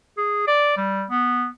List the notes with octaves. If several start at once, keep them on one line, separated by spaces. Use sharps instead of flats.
G#4
D5
G3
B3